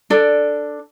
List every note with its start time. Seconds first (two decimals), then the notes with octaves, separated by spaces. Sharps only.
0.10 D4 A4 D5